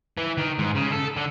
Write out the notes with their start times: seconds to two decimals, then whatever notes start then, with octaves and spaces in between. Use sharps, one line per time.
0.17 E3
0.37 D#3
0.58 G#2
0.75 C#3
0.92 A4
1.17 D3